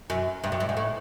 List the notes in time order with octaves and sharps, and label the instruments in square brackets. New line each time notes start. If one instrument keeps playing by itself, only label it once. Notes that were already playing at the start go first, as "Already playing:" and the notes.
[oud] F#2
G2
F#2
G2
G#2
A2